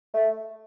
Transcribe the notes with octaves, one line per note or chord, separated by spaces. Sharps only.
A3